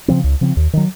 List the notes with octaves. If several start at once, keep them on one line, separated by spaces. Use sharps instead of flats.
C#3 F3 C4
C#2
C#3 F3 C4
D#2
D#3 F#3